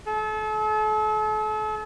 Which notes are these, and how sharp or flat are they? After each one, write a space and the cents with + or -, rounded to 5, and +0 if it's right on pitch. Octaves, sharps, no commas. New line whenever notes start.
A4 -40